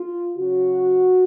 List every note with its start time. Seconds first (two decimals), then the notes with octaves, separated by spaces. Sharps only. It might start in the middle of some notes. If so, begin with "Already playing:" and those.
Already playing: F4
0.36 C#3 F#3 C#4 F#4